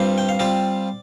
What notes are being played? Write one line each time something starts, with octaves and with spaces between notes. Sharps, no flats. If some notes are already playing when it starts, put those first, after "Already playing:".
Already playing: G2 G3 C4 F4 C5
G5
F5
G3 C4 F4 D5